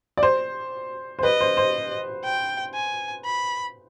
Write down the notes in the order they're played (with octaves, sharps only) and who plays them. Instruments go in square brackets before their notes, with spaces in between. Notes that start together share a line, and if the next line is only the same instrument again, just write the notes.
[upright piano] D5
C5
C5
[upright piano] B4 [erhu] D#5
[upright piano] C5
C5
[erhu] G5
G#5
B5